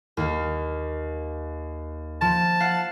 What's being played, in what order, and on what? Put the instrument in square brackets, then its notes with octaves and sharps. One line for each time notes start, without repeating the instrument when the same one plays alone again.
[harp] D#2 A#3
[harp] F3 [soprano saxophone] A5
[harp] F5 F#5